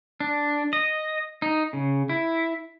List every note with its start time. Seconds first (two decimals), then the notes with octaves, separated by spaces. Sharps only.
0.20 D4
0.73 D#5
1.42 D#4
1.73 C#3
2.09 E4